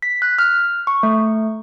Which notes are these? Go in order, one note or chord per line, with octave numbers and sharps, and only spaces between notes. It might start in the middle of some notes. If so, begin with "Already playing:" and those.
B6
F#6
F6
C#6
A3